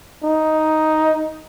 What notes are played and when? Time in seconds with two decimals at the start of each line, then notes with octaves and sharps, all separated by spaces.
0.24 D#4